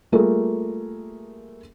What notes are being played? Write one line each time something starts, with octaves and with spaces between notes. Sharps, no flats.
G3 A3 A#3 F4 G#4 A#4